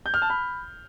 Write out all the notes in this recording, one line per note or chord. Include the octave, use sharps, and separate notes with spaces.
G6
F6
A5
B5